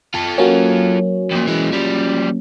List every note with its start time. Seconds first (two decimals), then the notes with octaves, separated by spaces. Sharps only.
0.14 F4 A4
0.38 F#3 A#3 C#4
1.31 F2 A#2
1.47 E3 G#3
1.72 F3 G3